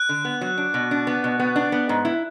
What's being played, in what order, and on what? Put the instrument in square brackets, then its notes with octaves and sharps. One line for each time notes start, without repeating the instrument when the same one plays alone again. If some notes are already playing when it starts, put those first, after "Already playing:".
Already playing: [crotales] F#6
[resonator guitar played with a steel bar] D3
B3
F#3
D4
B2
D4
B3
B2
B3
D4
B3
G#2
E4